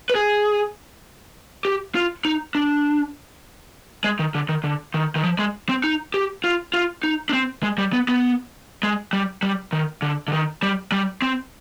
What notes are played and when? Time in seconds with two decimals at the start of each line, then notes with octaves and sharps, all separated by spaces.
0.10 B4
0.15 G#4
1.65 G4
1.95 F4
2.25 D#4
2.55 D4
4.04 G#3
4.19 D#3
4.35 D3
4.49 D#3
4.64 D3
4.94 D#3
5.15 D#3
5.24 F3
5.39 G#3
5.69 C4
5.84 D#4
6.14 G4
6.44 F4
6.74 F4
7.04 D#4
7.29 D4
7.33 C4
7.63 G#3
7.78 G3
7.93 B3
8.08 B3
8.83 G#3
9.13 G3
9.43 G3
9.73 D#3
10.02 D3
10.28 D3
10.33 D#3
10.63 G3
10.92 G3
11.22 C4